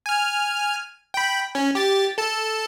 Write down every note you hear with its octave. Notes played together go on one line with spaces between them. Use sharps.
G#5 F6
G5 B5
C#4
G4 A6
A4 A5